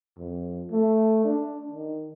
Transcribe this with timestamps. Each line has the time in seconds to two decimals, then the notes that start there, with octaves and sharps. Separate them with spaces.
0.18 F2
0.71 A3
1.25 D4
1.72 D#3